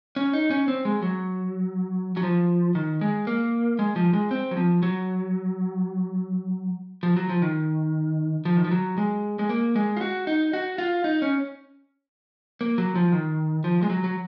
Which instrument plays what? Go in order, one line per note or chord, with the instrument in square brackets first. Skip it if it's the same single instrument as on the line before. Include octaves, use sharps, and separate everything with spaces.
[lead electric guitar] C#4
D#4
C#4
C4
G#3
F#3
F#3
F3
D#3
G#3
A#3
G#3
F3
G#3
C4
F#3
F3
F#3
F3
F#3
F3
D#3
F3
D#3
F3
F#3
G#3
G#3
A#3
G#3
F4
F#4
D#4
F#4
F4
D#4
C#4
A#3
F#3
F3
D#3
F3
G#3
F#3
F#3